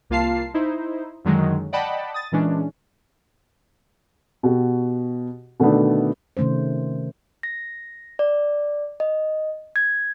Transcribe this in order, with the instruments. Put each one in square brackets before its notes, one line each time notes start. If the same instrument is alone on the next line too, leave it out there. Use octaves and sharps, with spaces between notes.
[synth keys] C2 A#3 F4 F5 A5 C7
D#4 E4 C5
F#2 D3 D#3 F#3 G#3
D5 D#5 F#5 G5 A5 B5
D#6 A6
A#2 E3 G#3 C#4 D4
[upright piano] B2 F#4 G4
B2 D3 D#3 A3 B3 D4
[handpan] C3 D#3 A3 C#4 C5
[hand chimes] A#6
D5
D#5
G#6